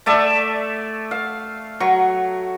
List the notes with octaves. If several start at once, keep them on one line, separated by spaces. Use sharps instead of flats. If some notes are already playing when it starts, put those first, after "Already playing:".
A3 D5 E5 A5
F5
F#3 C#6